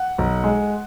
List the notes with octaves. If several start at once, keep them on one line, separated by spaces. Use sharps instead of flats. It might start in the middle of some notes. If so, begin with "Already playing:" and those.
Already playing: F#5
B1
G#3